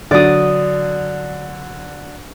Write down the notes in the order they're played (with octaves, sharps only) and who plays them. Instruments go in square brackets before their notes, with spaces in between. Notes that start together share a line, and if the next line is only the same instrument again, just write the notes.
[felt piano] D3 F#3 [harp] D5 D#6